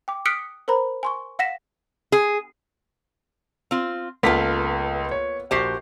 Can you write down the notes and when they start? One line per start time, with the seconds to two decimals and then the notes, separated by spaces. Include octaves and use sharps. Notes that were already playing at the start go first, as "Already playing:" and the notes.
0.08 G5 D6
0.25 D#6 F6 F#6 B6 C#7 D7
0.68 A#4 C5 A#5 B5
1.03 G#5 C6 C#6
1.39 F5 F#5 A#6 B6 E7
2.12 G#4
3.71 C4 F4
4.23 C#2 A#3 B3 F4 A4 B6
5.11 C#5
5.51 A#1 F#4 G4 C5 C7